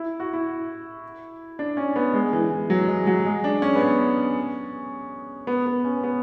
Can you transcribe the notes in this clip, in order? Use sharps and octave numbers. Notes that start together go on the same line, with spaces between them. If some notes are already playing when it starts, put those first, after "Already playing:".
Already playing: E4
F#4
E4
D4
C#4
B3
G#3
E3
E3
F#3
G#3
F#3
G#3
D4
C#4
B3
C#4
B3
B3
C#4
B3